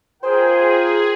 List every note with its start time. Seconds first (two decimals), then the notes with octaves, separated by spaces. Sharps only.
0.23 F4 G#4 A#4 C5 G5